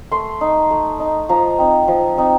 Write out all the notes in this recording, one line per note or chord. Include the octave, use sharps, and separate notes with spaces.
A3 C6
D#4
A3
D#4
F3 A#5
C4 D#4
F3
C4 D#4